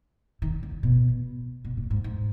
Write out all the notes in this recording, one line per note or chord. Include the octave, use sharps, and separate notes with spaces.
D#3
C#3
B2
B2
A#2
G#2
G#2